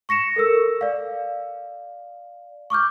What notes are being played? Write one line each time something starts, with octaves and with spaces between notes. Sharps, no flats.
C#6 A#6 C#7 E7
A4 A#4 E6
D5 F5
C#6 D6 F6 G6